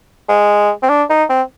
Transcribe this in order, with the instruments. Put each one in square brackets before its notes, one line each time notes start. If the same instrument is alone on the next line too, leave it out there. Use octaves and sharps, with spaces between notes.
[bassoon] G#3
C4
D4
D#4
C4